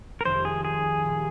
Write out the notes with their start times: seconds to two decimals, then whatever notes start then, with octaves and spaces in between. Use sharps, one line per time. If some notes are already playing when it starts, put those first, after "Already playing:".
0.21 A#4
0.25 F1 F2 D#3 G#3 C5
0.45 G#4
0.65 G#4
1.05 A#2 G3 A#3